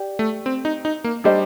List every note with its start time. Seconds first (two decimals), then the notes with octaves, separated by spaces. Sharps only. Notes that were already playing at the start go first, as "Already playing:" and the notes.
Already playing: G4 D5
0.19 A3
0.46 C4
0.65 D#4
0.85 D#4
1.04 A#3
1.24 G3 D4 G4 C5 D#5